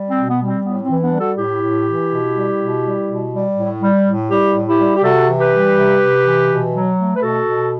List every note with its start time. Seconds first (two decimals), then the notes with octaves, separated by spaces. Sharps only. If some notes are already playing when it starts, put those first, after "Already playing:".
Already playing: G3
0.10 C4
0.16 B2
0.29 B3
0.41 G3
0.47 C4
0.64 A2 B3
0.83 C4
0.90 E3
1.02 B3 D4
1.13 G3
1.19 F#4 A4
1.37 A2 E4 G4
1.62 A2
1.87 E3
2.11 B2
2.36 G3
2.59 B2
2.84 G3
3.08 B2
3.33 G3
3.57 A2
3.82 G3
4.07 A2
4.31 G3 E4 G4
4.55 A2
4.67 E4 G4
4.79 G3
4.96 G4
5.03 C3 F#4 A4
5.28 E3
5.40 G4 B4
5.52 G3
5.76 C3
6.01 C3
6.25 E3
6.50 B2
6.74 F#3
6.98 A3
7.16 B4
7.22 B2 F#4 A4
7.47 B2